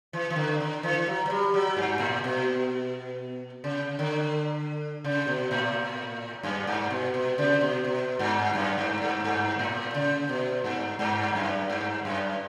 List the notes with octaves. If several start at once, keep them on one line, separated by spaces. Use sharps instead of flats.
E3
E3
D3
D3
E3
F#3
F#3
G3
F#3
G2
A2
B2
C#3
D3
C#3
B2
A2
F#2
G2
B2
B2
C#3
B2
B2
G2
F#2
G2
G2
G2
A2
C#3
B2
G2
G2
F#2
G2
F#2